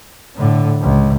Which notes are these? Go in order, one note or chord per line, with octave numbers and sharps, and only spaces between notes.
A2 D3
C#2